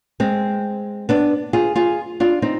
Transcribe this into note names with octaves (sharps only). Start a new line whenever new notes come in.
G#3 C4
B3 D4
F4 G#4
F4 G#4
D4 F4
C4 D#4